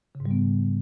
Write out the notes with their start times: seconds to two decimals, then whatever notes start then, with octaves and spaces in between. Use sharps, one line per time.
0.15 C#3
0.20 G#2
0.26 G3
0.31 B3